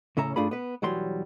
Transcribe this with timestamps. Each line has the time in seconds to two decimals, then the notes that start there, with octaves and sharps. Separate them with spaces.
0.17 A2 C#3 C#4 C#5 E5 A#5
0.36 G2 A3 D4 F4 G#4 B5
0.51 B3 B4
0.82 B1 E3 F#3 G3 C6